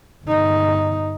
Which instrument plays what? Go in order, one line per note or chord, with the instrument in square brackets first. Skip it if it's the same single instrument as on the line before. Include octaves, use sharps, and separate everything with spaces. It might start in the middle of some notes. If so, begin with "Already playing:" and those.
[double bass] G1 D#4